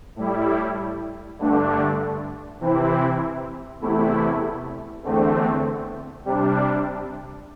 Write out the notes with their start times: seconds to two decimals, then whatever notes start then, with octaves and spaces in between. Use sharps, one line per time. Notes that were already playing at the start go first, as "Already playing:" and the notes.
0.16 A2 G3 E4
1.39 G2 D3 A3 D4
2.60 C3 E3 C4 E4
3.81 E2 C3 A3 E4
5.03 E2 D3 A3 C4
6.25 C3 G3 D4